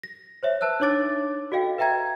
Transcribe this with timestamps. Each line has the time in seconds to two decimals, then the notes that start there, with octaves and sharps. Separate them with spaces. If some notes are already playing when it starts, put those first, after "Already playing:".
0.03 A#6
0.43 C5 C#5 E5
0.61 B4 A5 E6 F#6
0.80 D4 D#4 C#5 D6 A6 D7
1.52 F#4 A4 D#5 F5 G5
1.78 B4 E5 G5 A#5 G#6